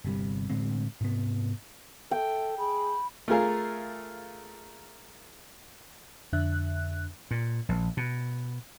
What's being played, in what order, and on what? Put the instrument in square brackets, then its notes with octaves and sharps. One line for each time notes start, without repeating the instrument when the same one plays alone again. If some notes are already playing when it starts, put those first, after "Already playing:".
[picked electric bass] G1 C3 G3
A2 D3 G#3 C4
G#2 C3 B3
[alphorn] A4 [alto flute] E5 [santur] G5
[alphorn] G#4 [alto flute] B5
[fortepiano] A3 F4 G#4 A#4 F5
[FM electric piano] F2 D3 D4 E5 F#6
[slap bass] A#2
A#1
B2